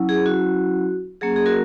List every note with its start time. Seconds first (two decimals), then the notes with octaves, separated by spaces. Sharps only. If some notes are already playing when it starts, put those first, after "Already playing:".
Already playing: F#3 C#4 E4
0.09 G#4
0.26 F#4
1.21 F#3 A#3 C#4 G#4
1.36 G#4
1.46 F#4 A#4